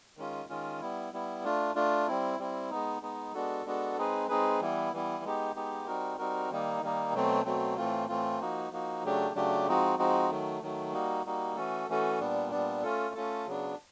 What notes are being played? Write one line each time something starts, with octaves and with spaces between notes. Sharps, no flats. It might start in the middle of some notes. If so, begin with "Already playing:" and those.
D#3 G#3 C#4 F4
D#3 G#3 C#4 F4
G3 B3 E4
G3 B3 E4
A3 D4 F4
A3 D4 F4
G3 C4 E4
G3 C4 E4
G#3 B3 D#4
G#3 B3 D#4
G#3 B3 D4 F#4 A4
G#3 B3 D4 F#4 A4
G#3 C4 D#4 G#4 B4
G#3 C4 D#4 G#4 B4
E3 G3 B3 E4
E3 G3 B3 E4
G#3 B3 D#4 G4
G#3 B3 D#4 G4
G3 C4 D#4 F#4 A#4
G3 C4 D#4 F#4 A#4
D#3 G3 A#3 D#4
D#3 G3 A#3 D#4
B2 F#3 A3 C4
B2 F#3 A3 C4
A2 E3 A3 C4 F4
A2 E3 A3 C4 F4
F3 A#3 D#4 F#4
F3 A#3 D#4 F#4
C#3 F#3 A3 D4 G4
C#3 F#3 A3 D4 G4
F3 G#3 C4 D#4 F#4
F3 G#3 C4 D#4 F#4
D#3 F#3 A3
D#3 F#3 A3
G3 A#3 D#4 F#4
G3 A#3 D#4 F#4
E3 A3 C#4 F#4 A4
E3 A3 C#4 F#4 A4
A#2 G3 B3 D4
A#2 G3 B3 D4
A3 C#4 F4 A4
A3 C#4 F4 A4
C#3 F#3 B3 D4